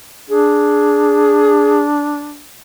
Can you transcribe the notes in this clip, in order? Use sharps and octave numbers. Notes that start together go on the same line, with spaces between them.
D4 G#4